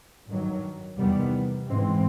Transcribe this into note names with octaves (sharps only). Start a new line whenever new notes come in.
G2 D#3 F#3
E2 C3 D#3 G3 B3
G#2 E3 G#3 C4